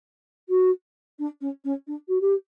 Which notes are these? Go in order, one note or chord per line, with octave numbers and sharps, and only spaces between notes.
F#4
D4
C#4
C#4
D4
F#4
G4